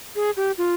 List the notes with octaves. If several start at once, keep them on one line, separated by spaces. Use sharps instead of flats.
G#4
G4
F4